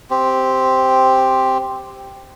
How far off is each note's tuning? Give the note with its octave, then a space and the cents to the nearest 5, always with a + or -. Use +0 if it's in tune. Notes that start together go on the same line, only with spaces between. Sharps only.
C4 +0 G4 +0